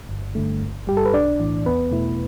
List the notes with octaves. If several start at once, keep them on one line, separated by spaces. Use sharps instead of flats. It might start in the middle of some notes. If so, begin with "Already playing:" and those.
G1
G2 D3 A3
G1
G2 G3 G4
A4
B4
B1 D4 D5
A2 E3
E2 B3 B4
B2 A3 E4